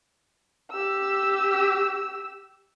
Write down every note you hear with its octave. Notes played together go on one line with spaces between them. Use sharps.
G4 E6